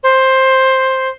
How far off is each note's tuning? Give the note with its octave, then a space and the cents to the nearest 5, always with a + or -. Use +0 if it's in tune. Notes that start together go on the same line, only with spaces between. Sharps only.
C5 +10